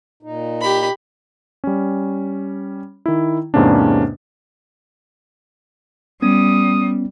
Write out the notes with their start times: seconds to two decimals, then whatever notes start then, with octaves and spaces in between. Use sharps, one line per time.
0.23 A#2 D#4
0.62 G4 B5
1.64 G3 C#4
3.06 D#3 E4
3.54 E2 G#2 C3 A#3 C#4 D4
6.22 G3 B3 C#4 D#6